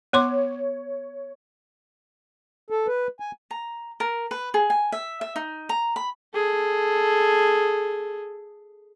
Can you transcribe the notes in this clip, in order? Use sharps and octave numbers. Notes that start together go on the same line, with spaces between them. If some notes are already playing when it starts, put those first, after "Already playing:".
B3 C#5 C6 D6
A4
B4
G#5
A#5
A#4
B4
G#4
G#5
E5
E5
D#4
A#5
B5
G#4 A4